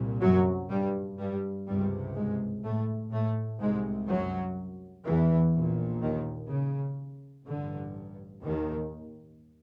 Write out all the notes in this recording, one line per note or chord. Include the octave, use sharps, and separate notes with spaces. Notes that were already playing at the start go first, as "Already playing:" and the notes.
Already playing: C2 A#2
F#2 F#3
G2 G3
G2 G3
C#2 G2 C3 G3
G#2 G#3
A2 A3
A2 A3
C2 G#2 C3 G#3
F#2 F#3
E2 E3
A#1 A#2
D#2 D#3
C#3
A1 G2 D3
D#2 D#3